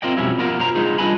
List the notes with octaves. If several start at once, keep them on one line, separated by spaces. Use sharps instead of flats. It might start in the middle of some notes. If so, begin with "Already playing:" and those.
C4 F4 A#4 D5 D#5 G5
B1 F2 B2 G3 C#4 E4
B3 F4 A#4 D5
F#2 A#4 C5 C#5 A#5
G#3 B3 D4 D#4 F4 G#4
G3 D4 B4 D#5 G#5 B5